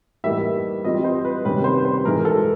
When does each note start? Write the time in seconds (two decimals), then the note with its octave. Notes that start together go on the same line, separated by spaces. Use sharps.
0.24 A2 E3 G3 A#3 D#4 E5
0.84 E3 G3 C4 F4 D#5
1.04 C5
1.25 B4
1.45 C3 D#3 G3 A#3 C#4 B4
1.64 C5
1.85 C5
2.05 G#2 E3 G#3 A#4
2.25 A4